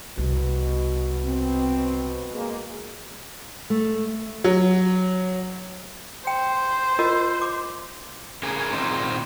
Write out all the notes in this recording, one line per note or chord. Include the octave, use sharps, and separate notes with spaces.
C2 B2
C4
G#3 A#3
A3
F#3
C5 G5
F4 A#4 D#5
D6
C#3 G#4 A#4 G#5
A#2 D#3 C4 D#4 C5